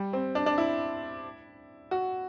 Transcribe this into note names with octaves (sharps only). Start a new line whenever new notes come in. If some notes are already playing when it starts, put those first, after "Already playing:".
Already playing: G3
C4
D4
D4
E4
F#4